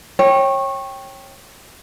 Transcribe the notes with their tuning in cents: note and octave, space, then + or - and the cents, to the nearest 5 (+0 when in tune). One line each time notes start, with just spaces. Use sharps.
C#5 -25 G5 +0